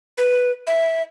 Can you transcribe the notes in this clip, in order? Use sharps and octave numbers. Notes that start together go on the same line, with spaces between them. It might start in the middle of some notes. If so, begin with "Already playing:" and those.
B4
E5